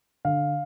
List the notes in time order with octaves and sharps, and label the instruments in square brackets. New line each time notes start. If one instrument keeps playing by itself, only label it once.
[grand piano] D3 F5